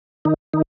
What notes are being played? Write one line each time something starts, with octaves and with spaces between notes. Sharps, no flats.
D#3 D#4
D#3 D#4